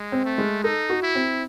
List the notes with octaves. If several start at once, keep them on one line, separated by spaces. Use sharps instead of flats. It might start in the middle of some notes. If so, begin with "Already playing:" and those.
Already playing: G#3
C4
A3
G#3
D#4 A4
F#4
E4
C4